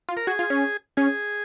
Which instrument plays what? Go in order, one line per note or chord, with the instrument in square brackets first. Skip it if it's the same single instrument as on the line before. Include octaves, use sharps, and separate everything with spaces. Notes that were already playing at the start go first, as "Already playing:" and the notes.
[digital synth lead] F4
[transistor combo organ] A#4
[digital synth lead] F#4 [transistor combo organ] G#4
[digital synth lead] F4
C#4
[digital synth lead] C#4 [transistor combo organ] G#4